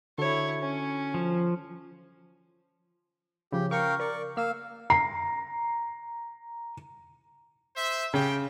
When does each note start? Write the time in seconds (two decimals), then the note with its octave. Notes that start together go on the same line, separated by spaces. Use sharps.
0.18 D3 E4 F#4 A4 C#5
0.61 C#4
1.14 F3
3.52 C#3 F3 G4
3.71 A#4 F5 G5 C#6
4.00 A#4 D5 C#6
4.37 A#3 F5 E6
4.90 A#5 C7
7.76 C5 E5
8.14 C#3 G4 G5